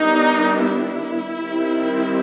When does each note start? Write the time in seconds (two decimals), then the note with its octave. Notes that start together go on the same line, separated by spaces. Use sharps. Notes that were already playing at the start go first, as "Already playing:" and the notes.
Already playing: D#3 G3 B3 D4 D#4
0.63 E4
1.43 D#3 G3 C4